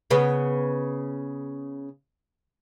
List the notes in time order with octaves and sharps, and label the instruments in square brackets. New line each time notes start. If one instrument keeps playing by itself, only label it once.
[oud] C#3 B3